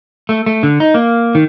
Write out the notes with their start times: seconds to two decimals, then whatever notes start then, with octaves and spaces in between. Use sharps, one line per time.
0.29 A3
0.46 A3
0.63 D3
0.80 D#4
0.94 A#3
1.35 D#3